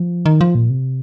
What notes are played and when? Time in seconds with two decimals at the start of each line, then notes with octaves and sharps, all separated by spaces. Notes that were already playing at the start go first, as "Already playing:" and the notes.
Already playing: F3
0.26 D#3
0.41 F3
0.55 A#2
0.70 C3